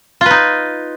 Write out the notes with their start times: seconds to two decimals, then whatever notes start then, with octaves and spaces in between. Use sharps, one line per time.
0.21 F4
0.26 B4
0.31 D#4